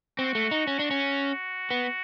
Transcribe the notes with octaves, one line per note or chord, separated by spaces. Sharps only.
C4 F#4
A3
D#4
C#4
D4 F#4
C#4
B3